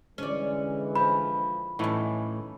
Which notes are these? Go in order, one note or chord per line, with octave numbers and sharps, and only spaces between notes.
D3 E3 G#3 C#4 D5
F3 B5
A2 E3 C#4 D#4